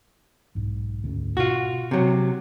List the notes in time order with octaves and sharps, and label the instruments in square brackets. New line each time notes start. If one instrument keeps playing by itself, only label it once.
[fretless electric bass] B1 G#2
D2 G#2 C#4
[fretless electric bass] B2 [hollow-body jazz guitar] F4 F#4
[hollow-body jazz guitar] C3 F#3